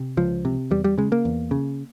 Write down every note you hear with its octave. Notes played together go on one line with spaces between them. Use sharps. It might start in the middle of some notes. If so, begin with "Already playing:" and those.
Already playing: C3
C#2 F3
C3
E2 G3
G3
C#3 G#3
A#3
E2
C#3